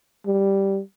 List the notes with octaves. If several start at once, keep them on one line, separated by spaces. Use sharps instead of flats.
G3